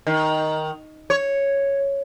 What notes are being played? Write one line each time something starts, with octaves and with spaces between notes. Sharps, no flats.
D#3
C#5